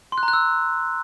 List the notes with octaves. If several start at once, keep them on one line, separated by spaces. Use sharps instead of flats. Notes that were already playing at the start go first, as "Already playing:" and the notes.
C6
F#6
A#5
F#6
E6